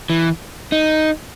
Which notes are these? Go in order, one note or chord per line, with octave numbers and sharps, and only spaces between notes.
E3
D#4